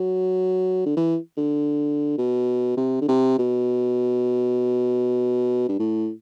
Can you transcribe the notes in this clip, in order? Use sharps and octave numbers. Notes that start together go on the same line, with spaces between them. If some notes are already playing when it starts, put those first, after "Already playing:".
Already playing: F#3
D3
E3
D3
B2
C3
D3
C3
B2
G2
A2